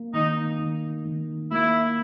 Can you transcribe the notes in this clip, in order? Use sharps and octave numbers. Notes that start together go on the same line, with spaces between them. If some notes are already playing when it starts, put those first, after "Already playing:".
Already playing: A#3
D#3 D#4
D#3
D#3
A#3 E4